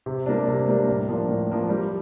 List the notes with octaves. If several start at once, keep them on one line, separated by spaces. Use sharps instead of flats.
C3
G3 A#3 D4
C3
G3 A#3 D4
A2
F3 A#3 D4
A2
F3 A#3 D4
G3